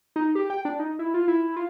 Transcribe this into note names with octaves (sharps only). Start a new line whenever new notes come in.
D#4
G4
G5
D4
D#4
E4
F4
E4
F4